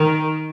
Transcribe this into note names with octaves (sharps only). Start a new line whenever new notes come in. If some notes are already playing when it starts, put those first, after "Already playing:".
Already playing: D#3